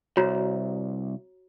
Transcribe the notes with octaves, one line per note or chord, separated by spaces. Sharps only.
C2 F#4 C#5 A#5